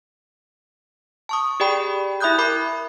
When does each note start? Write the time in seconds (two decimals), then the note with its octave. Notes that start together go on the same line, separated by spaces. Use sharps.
1.29 A5 C#6 D#6
1.60 G4 G#4 D5 G5 B5
2.20 E4 E5 B5 D#6 F#6 G6
2.38 A#4 B5 D6